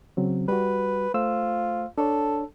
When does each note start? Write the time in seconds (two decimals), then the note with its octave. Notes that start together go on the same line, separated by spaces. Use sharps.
0.17 C#3 F#3 C4
0.48 G3 F#4 B4
1.14 A3 F4 C5 E6
1.98 D4 A4 C#5